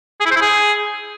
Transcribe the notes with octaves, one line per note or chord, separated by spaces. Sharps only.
G#4
E4
C5
E4
G#4